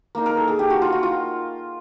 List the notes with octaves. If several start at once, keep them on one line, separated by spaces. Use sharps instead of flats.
A#3 D#4
A#4
A4
G#4
G4
F#4
F4
F#4
F4